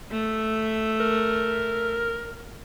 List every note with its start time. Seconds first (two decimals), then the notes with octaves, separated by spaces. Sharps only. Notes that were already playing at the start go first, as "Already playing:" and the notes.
0.11 A3 E5
1.00 A#4